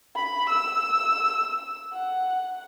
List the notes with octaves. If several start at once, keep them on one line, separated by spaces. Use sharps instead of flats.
B5
E6
F#5